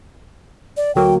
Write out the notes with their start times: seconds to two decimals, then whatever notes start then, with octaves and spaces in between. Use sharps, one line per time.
0.77 D5
0.95 D2 F#3 A#3 G5